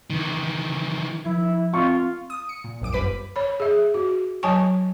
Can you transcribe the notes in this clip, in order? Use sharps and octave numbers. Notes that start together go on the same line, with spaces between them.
D#3 E3
F3 E4 G#6
C4 F4 C#6
D#6
C#7
A#2
A#1 F#2 D6 D7
G1 F#2 G3 B4 B6 D#7
C#5 B5
G#4 E5
F#4
F#3 C#5 G#5 A5 C#6